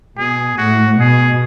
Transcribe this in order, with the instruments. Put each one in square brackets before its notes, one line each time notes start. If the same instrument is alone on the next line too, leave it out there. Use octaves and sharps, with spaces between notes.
[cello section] B2 [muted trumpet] G#4
[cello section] A2 [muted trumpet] F#4
[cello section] B2 [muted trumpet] G#4